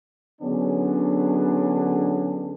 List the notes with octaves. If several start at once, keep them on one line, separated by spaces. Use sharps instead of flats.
D3 F#3 B3 C#4 D4 G#4